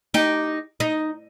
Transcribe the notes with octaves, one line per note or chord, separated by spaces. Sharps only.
D#4 G4
D#4